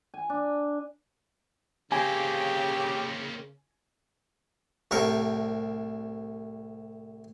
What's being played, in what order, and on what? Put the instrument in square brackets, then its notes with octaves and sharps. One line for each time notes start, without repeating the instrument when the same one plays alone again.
[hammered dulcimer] G#5
D4
[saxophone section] C#3 [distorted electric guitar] A#3 C4 [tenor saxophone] G4 [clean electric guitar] G#5
[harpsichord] C2 A2 G4 A#4 C#6